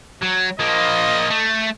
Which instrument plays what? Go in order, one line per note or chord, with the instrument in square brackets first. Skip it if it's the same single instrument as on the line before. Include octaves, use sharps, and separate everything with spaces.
[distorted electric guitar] F#3
[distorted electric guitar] F3 A#3 [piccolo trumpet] D#5
[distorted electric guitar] A3